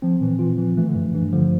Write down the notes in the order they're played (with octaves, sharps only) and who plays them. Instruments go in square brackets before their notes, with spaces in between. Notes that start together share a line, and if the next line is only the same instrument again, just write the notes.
[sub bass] F3 [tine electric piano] C4
[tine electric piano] A#2 [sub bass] E3
[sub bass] E3 [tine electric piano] F4
[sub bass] E3 [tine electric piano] F3
[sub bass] E3 [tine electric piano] A3
[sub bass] D3
[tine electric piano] G2 [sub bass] E3
[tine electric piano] G2 [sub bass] E3
[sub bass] D3 [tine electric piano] F3